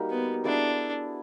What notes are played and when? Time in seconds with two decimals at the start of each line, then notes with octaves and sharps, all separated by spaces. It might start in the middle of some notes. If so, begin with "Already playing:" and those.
Already playing: G3 A#3 D#4 F#4
0.10 B3
0.45 B3 D4 E4 G#4